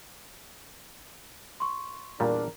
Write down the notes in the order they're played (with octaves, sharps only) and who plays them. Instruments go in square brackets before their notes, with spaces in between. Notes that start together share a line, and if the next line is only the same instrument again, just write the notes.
[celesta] C6 C#6
[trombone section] E2 D4 A#4 [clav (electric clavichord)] A#2 G3